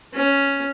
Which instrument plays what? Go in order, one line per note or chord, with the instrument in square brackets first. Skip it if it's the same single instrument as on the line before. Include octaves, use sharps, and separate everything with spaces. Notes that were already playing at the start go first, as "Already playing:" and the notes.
[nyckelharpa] C#4